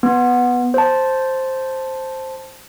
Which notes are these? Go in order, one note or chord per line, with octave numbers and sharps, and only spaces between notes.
B3
C5 A5